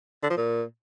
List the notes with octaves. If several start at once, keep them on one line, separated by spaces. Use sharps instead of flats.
D3
F3
A#2